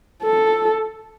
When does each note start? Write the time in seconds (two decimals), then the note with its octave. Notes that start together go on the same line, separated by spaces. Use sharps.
0.23 A4